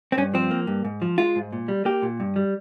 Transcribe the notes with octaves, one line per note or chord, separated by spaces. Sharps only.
C4
G2 C#4
F3 C4
A#3
G2
G#2
F3
G#3 F4
G#2
A#2
G3
A#3 G4
A#2
G2
G3